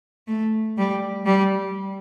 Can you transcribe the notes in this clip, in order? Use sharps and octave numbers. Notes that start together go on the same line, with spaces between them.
A3
G3
G3